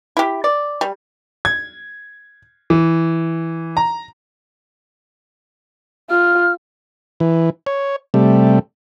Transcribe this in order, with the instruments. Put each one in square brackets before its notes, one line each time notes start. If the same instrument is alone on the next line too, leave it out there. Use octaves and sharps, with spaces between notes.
[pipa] E4 G4
D5
G3
[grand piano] G#6
E3
A#5
[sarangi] F4 [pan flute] F6
[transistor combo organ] E3
C#5
C3 G3 A3